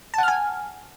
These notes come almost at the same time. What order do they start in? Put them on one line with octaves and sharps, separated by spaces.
A5 F#5 F6 G#5